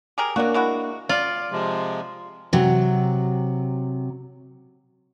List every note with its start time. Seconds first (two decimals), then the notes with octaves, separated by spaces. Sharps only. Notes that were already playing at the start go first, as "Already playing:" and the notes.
0.18 G4 G#4 A#4
0.36 F#3 A#3 D4 F#4
0.54 G#3 E4 F#4
1.09 F4 D5
1.52 C3 F3 G#3
2.53 C3 F#3